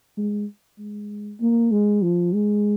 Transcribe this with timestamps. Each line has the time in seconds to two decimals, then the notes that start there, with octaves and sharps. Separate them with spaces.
0.17 G#3
0.79 G#3
1.40 A#3
1.71 G#3
2.02 F3
2.33 G#3